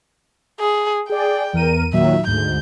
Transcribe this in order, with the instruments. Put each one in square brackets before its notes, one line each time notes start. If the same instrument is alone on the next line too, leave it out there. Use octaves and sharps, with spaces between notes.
[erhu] G#4
[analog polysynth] G#4 D5 [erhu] G5
[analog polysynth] E2 A#4 D#7
[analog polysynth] A#2 D#3 F#3 [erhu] E5
[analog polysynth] D2 G#2 [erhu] G6